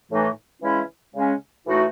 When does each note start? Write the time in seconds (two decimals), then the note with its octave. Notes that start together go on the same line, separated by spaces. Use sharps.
0.11 A2 E3 A3 D#4
0.62 C#3 E3 G#3 C#4 E4
1.14 C#3 G#3 C#4
1.66 A2 E3 A3 D#4 F#4